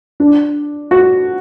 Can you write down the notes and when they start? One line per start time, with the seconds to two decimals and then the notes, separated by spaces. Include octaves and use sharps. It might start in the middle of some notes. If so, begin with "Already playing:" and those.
0.20 D4
0.91 F#4